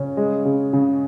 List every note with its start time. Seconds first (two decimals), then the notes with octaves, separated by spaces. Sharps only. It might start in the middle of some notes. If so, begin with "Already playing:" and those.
Already playing: C#3 C#4
0.17 G#3
0.45 C#3
0.73 C#3